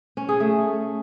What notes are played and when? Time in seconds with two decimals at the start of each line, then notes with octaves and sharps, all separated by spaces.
0.17 C#4
0.29 G#4
0.40 A3